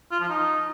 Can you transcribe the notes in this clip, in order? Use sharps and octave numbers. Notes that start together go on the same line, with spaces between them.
F4
F3
D#4